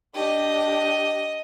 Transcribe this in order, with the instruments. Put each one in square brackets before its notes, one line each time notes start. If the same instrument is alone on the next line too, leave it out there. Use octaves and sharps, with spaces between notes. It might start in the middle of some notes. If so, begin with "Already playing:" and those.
[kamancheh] D4 G4 [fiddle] D#5